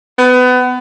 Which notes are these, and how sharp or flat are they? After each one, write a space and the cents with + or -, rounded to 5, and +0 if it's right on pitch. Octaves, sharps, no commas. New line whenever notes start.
B3 +25